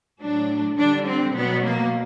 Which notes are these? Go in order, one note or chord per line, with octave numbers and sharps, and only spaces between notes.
A2 F#3 D4
D3 G3 D4
C4
B2 F#3 B3
A#3